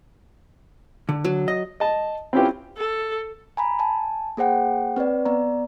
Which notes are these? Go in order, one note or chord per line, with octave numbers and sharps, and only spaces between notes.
D3
F#3
D#5
D#5 A5
C4 C#4 E4 F4 G4 B4
A4
G#5 A#5 B5
G#5 A5
A#3 G#4 C5 F#5 G5
C4 B4 C#5 D5
B3 D5 A#5